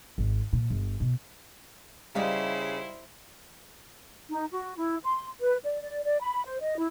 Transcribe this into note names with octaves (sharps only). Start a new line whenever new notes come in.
G#1
A#2
G1
B2
C#3 G3 D#4 E4 G4 C5 F5
D#4
F#4
E4
C6
B4
D5
D5
D5
B5
C5
D#5
E4